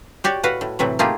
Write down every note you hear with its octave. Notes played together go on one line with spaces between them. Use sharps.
F#4 G4 C#5 D5
A2 F#4 B4 F5 F#5
A2
A2 C3 E3 F#3
A3 A#3 D#4 F4 G4 G#4